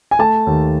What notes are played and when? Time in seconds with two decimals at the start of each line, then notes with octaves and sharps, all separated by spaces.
0.11 G#5
0.19 A3 A5
0.47 D#2